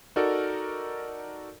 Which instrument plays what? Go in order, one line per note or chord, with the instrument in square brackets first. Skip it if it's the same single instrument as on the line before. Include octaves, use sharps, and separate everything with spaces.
[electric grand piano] D#4 F#4 A4 A#4 D5